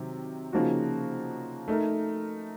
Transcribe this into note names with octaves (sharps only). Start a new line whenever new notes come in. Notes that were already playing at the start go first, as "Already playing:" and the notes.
Already playing: C3 D#3 F#3
C#3 F3 A#3 D#4 F#4
A3 D#4 A#4